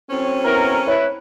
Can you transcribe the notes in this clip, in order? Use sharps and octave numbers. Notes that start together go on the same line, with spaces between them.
A2 F#3 C4 C#4
B3 E4 A#4
E4 B4 C#5